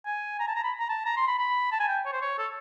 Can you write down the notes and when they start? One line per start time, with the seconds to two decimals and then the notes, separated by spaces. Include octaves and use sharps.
0.06 G#5
0.40 A#5
0.48 A5
0.56 A#5
0.64 B5
0.79 A#5
0.89 A5
1.06 A#5
1.17 C6
1.28 B5
1.38 B5
1.72 A5
1.80 G#5
1.88 G5
2.06 C#5
2.13 C5
2.22 C#5
2.39 A4